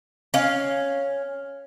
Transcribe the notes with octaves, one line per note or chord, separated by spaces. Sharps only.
C#4 F5